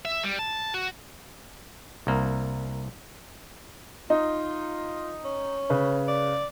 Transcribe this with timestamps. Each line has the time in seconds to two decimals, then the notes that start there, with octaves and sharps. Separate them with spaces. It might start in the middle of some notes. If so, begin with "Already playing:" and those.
0.05 E5
0.24 G3
0.39 A5
0.74 F#4
2.07 C2 A#3
4.10 D#4 F4
5.25 C#4
5.70 C#3 B4
6.08 D5